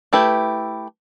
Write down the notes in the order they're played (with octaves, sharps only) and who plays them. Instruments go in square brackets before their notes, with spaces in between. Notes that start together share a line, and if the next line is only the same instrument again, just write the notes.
[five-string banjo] A3 E4 G4 B4